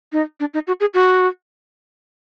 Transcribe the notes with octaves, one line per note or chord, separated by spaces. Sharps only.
D#4
D4
D#4
F#4
G#4
F#4